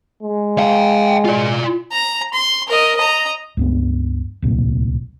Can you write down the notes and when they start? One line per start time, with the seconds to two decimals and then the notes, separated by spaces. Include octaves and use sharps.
0.23 G#3
0.58 F5 G5
1.25 F4 D5
1.92 A#5
2.33 C6
2.68 A#4 D#5
2.97 D#5 A#5
3.57 C#2 G2 B3
4.42 D1 C2 A#2